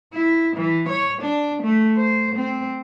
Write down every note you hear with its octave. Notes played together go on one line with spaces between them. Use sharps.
E4
E3
C#5
D4
A3
C5
C4